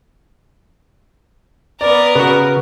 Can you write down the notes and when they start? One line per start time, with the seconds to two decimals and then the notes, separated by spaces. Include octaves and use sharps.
1.81 B3 A#4 D5
2.15 C#3 F#4 B4